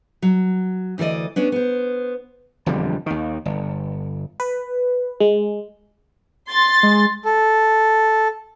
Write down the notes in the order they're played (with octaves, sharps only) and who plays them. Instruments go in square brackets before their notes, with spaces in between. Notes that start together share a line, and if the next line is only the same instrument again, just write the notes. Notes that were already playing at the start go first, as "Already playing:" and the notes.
[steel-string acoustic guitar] F#3
D2 E3 G#4 D5 D#5
B3 C#4 D4
B3 C5
[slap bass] E1 F2 D3 G3
D#2 D#3
G1
[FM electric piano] B4
G#3
[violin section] C6 A6
[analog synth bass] G#3
[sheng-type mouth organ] A4